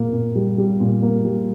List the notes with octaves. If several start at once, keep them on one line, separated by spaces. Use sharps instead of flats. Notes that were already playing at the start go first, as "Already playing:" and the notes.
Already playing: A#2 A#3
A#2
G3
G3
A#2
A#3
G3